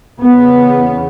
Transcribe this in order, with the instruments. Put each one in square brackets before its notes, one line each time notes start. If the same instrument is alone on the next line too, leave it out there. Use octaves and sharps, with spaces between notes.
[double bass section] E2 C#3 B3